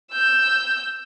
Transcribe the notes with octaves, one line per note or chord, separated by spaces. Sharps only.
E6 G6